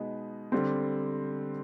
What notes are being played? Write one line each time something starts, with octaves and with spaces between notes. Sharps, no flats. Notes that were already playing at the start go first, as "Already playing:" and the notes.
Already playing: B2 G#3 B3 D#4
D3 G3 C4